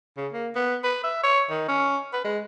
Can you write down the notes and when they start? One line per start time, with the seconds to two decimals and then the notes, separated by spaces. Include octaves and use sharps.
0.17 C#3
0.33 A#3
0.55 B3
0.84 B4
1.03 E5
1.23 C#5
1.50 D#3
1.68 C#4
2.13 B4
2.25 G#3